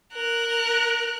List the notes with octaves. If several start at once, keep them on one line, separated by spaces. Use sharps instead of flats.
A#4 F#6